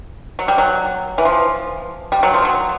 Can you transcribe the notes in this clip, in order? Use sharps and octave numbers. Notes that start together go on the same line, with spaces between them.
F#3
G3
F#3
E3
F3
G3
F#3
F3
F#3